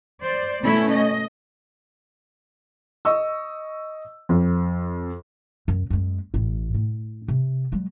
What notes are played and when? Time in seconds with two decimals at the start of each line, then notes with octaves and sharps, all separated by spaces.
0.21 C5 D5
0.63 B2 A3 C#4 E4
0.93 D#5
3.05 D#5 C#6 E6
4.29 F2
5.68 F#2
5.90 F#2 G#3
6.34 A1 A2
6.74 A2
7.28 C3
7.72 F#3 G#3